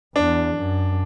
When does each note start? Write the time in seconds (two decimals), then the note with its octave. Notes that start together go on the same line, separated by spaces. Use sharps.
0.15 E2 D4
0.57 F#2